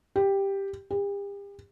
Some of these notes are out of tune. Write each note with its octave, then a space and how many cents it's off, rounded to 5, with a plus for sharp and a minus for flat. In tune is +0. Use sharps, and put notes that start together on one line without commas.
G4 +5
G4 +40